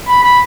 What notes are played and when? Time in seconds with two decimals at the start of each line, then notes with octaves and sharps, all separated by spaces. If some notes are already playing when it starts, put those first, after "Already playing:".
0.08 B5
0.23 B5